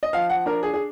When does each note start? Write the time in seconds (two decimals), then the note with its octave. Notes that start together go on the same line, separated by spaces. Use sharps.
0.03 D#5
0.13 F3 F5
0.30 F#5
0.46 D4 A#4
0.63 G#4
0.74 G#4